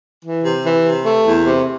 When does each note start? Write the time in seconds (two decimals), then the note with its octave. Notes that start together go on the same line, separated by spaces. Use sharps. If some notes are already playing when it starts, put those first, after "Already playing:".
0.24 E3
0.44 C3
0.65 E3
0.85 C3
1.06 A3
1.26 E2
1.46 C3